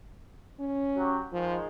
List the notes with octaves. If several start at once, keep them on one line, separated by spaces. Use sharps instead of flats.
C#4
F#3 F#4 G4
D#3 F3 G#3